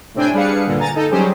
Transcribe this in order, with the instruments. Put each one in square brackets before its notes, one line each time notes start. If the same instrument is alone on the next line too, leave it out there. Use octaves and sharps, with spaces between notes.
[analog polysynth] A2 C3 C4 D4 G5 G#5
G3 D4 G#4 B4 F5 C#7
C#2 G2 A#2 D3
G#5 A#5 A6
D#4 A4
F#3 G3 C#4 G4 G#4 C5